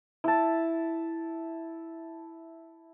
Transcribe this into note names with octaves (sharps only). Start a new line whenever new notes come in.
E4 A5